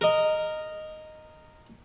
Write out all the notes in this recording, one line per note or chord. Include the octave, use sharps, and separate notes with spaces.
A#4 D#5